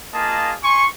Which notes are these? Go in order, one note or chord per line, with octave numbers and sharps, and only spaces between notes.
A#3 F4 G#4 D#5 A5
G#5 C6 C#6